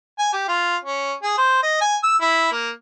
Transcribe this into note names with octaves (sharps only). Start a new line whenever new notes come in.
G#5
G4
F4
C#4
G#4
C5
D#5
G#5
E6
E4
A#3